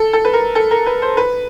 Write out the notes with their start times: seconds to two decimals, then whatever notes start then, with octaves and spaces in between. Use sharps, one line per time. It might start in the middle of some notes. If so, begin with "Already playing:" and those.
Already playing: A4
0.13 A4
0.25 B4
0.33 A#4
0.55 A4
0.71 A#4
0.86 B4
1.02 C5
1.17 B4